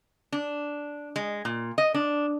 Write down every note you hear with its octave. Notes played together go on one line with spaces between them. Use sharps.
D4
G#3
A#2
D#5
D4